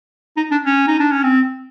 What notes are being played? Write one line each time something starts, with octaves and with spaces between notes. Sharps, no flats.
D#4
D4
C#4
D#4
D4
C#4
C4